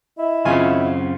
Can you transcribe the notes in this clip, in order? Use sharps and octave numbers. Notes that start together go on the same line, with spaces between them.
E4 D#5
F#2 C#3 C4 C#4 F4 G#5